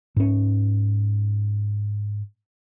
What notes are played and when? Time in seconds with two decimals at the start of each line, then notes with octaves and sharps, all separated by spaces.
0.16 G#2 C#4